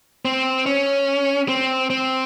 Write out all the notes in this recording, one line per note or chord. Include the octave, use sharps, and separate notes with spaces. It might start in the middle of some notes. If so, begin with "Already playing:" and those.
C4
C#4
C4
C4